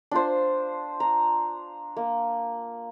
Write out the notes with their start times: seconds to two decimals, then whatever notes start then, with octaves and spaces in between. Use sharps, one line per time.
0.11 D4 F4 C5
1.00 A#5
1.97 A#3